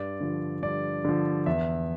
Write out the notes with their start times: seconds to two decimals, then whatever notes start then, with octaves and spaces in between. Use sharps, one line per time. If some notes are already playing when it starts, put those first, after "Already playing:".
Already playing: G2 D5
0.21 D3 F3
0.62 G2 D5
1.05 D3 F3
1.46 E2 E5